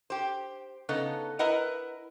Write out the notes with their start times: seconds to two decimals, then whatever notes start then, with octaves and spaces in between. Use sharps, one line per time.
0.10 G4 C5
0.89 C#3 B3 D#4 A4
1.39 E4 A#4 B4 D#5 F#5